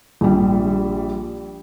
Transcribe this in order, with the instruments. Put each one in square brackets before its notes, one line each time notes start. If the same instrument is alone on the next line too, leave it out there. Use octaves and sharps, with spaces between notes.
[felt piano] A#1 G3